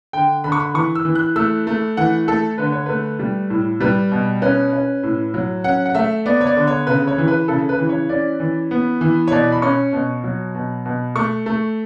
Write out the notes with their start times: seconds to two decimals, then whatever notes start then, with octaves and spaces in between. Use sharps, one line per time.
0.13 D3 G5
0.44 D3 B5
0.52 C#6
0.60 B5
0.74 E3 C#6
0.95 E6
1.05 E3
1.15 F#6
1.36 A3 E6
1.67 A3
1.97 E3 F#5
2.28 A3 A4
2.58 D3 B4
2.72 C#5
2.86 A3 B4
3.19 G3
3.50 A2
3.81 G3 B4
4.11 B2
4.42 C#4 B4
4.73 C#4
5.03 A2
5.34 F#3
5.64 C#4 F#5
5.86 F#5
5.95 A3 E5
6.26 B3 D5
6.41 C#5
6.47 D5
6.56 D3
6.67 C#5
6.87 C#3 B4
7.07 C#5
7.18 E3
7.28 B4
7.48 C#3 A4
7.69 B4
7.79 E3
7.89 C#5
8.09 C#4 D5
8.40 E3
8.71 B3
9.01 E3
9.28 C#5
9.32 B2 D5
9.52 B5
9.62 C#4 C#6
9.93 B2
10.24 F#3
10.55 B2
10.85 B2
11.16 A3 C#6
11.46 A3